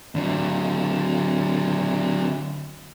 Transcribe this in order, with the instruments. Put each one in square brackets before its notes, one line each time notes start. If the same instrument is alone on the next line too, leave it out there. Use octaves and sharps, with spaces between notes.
[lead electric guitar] D3 F#3